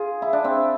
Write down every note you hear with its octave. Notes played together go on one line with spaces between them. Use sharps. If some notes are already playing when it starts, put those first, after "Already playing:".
Already playing: F4 G#4
E4
D4
C4